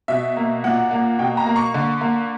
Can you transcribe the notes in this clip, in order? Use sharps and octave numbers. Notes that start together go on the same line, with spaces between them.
B2 E5
A#3
A#2 F#5
A#3
B2 G5
A#5
A#3
C#6
D3
A#3